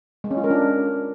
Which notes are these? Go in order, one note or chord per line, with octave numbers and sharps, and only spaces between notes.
G#3
C#4
F4
A#4
D4